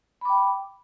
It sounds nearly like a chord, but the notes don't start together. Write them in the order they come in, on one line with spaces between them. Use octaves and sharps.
B5 D6 G5